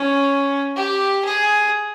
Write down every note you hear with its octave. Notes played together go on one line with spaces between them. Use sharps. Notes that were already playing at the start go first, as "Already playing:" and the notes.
Already playing: C#4
G4
G#4